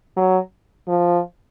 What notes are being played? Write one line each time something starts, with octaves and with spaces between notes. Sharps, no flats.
F#3
F3